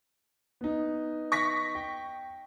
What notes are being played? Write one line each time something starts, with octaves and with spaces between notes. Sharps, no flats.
B3 D#4
C#6 A#6 B6
G5